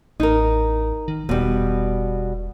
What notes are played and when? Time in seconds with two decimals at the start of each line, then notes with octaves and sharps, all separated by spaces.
0.20 A1 D#4 A#4
1.08 D#3
1.29 E1 B2 G3